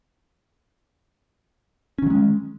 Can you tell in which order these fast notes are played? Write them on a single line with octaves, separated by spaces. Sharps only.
C#4 D#3 F#3 G#3